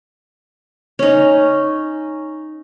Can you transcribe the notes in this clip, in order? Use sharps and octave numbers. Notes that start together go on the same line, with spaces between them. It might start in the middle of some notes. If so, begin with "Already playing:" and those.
C#4 D#4